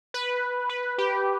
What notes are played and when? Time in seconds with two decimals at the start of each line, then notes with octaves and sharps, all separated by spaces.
0.14 B4
0.69 B4
0.98 G4